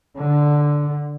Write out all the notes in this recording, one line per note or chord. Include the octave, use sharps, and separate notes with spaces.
D3